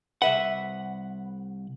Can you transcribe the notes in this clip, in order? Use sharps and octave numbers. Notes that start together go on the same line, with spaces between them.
C2 B4 E5 F#5